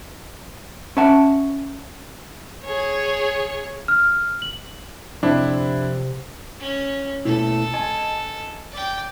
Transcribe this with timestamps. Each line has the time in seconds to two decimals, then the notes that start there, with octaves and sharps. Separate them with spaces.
0.97 C#4 E5 F#5 A5
2.65 G#4 C#5
3.88 F6
4.42 F#7
5.23 F2 C3 C4 D4 E4
6.59 C#4
7.25 B2 A3 E4 A4
7.74 D#5 G#5 A5
8.71 D5 G5